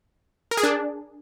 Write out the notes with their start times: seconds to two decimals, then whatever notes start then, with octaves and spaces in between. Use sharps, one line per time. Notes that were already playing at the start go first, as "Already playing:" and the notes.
0.51 A#4
0.57 G#4
0.63 D4